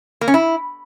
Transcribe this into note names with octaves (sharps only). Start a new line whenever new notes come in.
A#3
C#4
E4